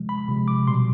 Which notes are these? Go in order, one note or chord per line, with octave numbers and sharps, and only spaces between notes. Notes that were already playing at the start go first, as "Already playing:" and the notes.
Already playing: C3 F3 G#3
B5
C3 F3 G#3
D6
B2 G3 C6